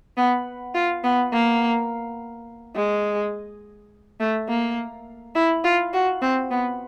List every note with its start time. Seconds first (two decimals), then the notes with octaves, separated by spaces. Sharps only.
0.17 B3
0.75 F4
1.04 B3
1.32 A#3
2.76 G#3
4.20 A3
4.48 A#3
5.35 E4
5.64 F4
5.93 F#4
6.22 C4
6.51 B3